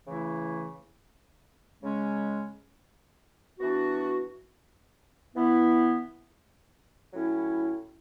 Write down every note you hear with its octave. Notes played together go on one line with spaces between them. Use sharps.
C#3 E3 A3 E4
C#3 G#3 C#4
E3 B3 D4 F#4
E3 B3 E4
A2 F#3 C#4 E4